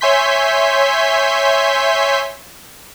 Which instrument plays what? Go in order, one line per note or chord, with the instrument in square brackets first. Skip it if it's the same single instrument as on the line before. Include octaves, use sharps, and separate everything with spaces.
[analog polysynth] C#5 E5 G#5 C6 G6 B6